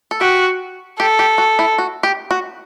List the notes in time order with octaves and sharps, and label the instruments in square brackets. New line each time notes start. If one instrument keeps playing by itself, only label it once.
[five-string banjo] A4
[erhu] F#4 [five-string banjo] G4
[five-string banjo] G4 [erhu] A4
[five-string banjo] G4
F#4
E4
F#4
G4
F#4